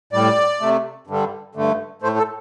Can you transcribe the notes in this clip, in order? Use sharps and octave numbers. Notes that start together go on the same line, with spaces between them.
A2 G3 D5
C3 A3
G2 D3 G3
G2 D3 A3
A2 A3 C5
A4